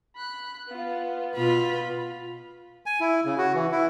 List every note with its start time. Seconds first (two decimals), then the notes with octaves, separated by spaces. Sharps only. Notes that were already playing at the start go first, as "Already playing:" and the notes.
0.16 B5 F#6
0.67 B3 F4
1.35 B2 F4 B4 B5
2.86 G#5
3.00 E4
3.25 C#3
3.38 F#4
3.55 E3
3.72 E4